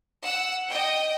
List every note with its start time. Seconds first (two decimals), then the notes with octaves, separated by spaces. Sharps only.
0.23 F#5 E6
0.69 D#5 G5